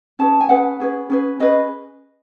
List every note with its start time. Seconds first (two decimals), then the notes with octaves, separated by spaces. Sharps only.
0.19 C#4 G#4 B4 A5
0.41 G#5
0.49 C#4 G#4 B4 F#5
0.80 C#4 G#4 B4
1.10 C#4 G#4 B4
1.40 C#4 G#4 B4 D#5